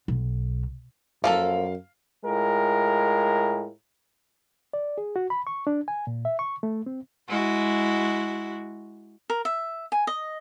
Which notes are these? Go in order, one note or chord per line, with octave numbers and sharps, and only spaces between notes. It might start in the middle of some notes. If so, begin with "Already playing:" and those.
B1
F#2 F3 A#3 A4 F5
A2 G#3 F4 A#4
D5
G#4
F#4
B5
C#6
D4
G#5
A#2
E5
C#6
A3
C4
G#3 E4 F#4
A#4
E5
G#5
D#5